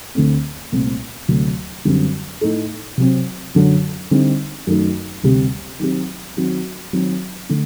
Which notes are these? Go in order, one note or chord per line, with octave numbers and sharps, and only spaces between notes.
D2 D3 A3 C4
C2 A#2 A3 C4
D2 C3 F#3 A3
F#2 D3 G3 C4
A2 A3 D#4 A4
C3 F#3 C4
F#2 D3 F#3
D3 G3 C4 D#4
F#2 D#3 A3 D#4
D2 C3 G3 C4 G4
D#3 F#3 C4 G4
D#3 F#3 C4 F#4
D#3 F#3 C4
D3 A3 D4